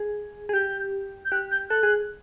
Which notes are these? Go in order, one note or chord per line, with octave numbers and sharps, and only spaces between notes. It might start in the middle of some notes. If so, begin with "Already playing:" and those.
Already playing: G#4
G#4
G4 G6
G6
G4 F#6
G6
A4 F#6
G#4